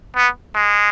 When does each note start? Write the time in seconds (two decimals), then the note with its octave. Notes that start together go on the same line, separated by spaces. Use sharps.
0.16 B3
0.55 G#3